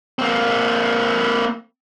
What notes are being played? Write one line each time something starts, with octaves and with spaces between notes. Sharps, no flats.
A#3 C4